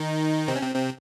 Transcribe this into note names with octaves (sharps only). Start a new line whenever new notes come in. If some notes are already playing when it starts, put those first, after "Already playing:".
Already playing: D#3 D#4
C3 C4
C#4
C3 C4
C3 C4